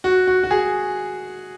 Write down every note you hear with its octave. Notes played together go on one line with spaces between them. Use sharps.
F#4
F#4
F#4
G#4